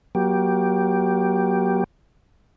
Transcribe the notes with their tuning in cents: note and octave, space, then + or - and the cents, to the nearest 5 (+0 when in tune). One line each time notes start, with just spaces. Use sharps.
F#3 +0 A#3 +35 G4 +0